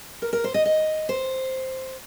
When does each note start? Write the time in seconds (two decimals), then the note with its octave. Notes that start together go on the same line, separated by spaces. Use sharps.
0.22 A#4
0.33 A#4
0.44 C5
0.54 D#5
0.65 D#5
1.09 C5